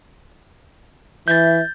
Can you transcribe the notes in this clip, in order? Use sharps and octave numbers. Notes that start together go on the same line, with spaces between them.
E3 E5 G6 A6